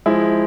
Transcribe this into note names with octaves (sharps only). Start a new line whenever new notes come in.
F3 G#3 E4